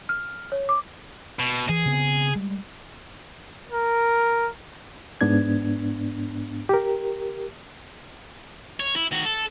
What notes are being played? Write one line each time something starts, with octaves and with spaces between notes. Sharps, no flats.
F6
C#5
D6
B2
E3 G#4
C#3 B3 C4
G3 G#3
A#4
G#2 B3 D4 G#6
G4 A#4
C#5
E4
D#3 F#4
A4